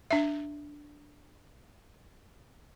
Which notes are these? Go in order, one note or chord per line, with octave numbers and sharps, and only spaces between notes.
D4 E5